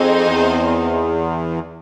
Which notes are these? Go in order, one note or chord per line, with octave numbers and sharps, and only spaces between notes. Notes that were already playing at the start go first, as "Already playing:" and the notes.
Already playing: F2 C4 D#4 G#4 C5
E2